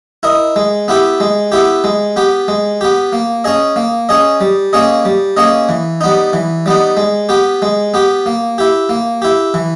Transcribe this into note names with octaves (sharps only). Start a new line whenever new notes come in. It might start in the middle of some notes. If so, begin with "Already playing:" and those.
E4 A#4 D#5
G#3
B3 E4 G4
G#3
B3 E4 G4
G#3
B3 G4
G#3
B3 G4
A#3
C#4 G#4 D#5
A#3
C#4 G#4 D#5
G3
A#3 C#4 G#4 D#5
G3
A#3 C#4 G#4 D#5
E3
G3 B3 D#4
E3
G3 B3 D#4
G#3
B3 G4
G#3
B3 G4
A#3
E4 G4
A#3
E4 G4
E3